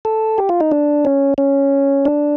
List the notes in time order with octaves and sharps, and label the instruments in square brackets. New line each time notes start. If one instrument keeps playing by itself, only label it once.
[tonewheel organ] A4
G4
F4
D#4
D4
C#4
C#4
D4